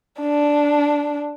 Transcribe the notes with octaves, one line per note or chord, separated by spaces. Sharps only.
D4